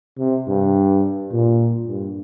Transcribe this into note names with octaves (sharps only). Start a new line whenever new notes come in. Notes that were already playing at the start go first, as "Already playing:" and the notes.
C3
G2
A#2
G2